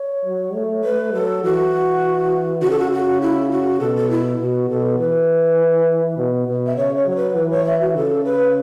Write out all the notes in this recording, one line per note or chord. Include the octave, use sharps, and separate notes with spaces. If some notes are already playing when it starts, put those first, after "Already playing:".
Already playing: C#5
F#3
A3
A3 B4
F#3 A4
E3 F#4
C#3 F#4
A4
F#4
F#4
E4
F#4
B2 A4
A4
E4
B2 F#4
B2 A4
E3 B4
B2
B2
E5
C#3 C#5
C#5
F#3 C#5
B4
E3 B4
C#5
E5
F#4
C#3 A4
B4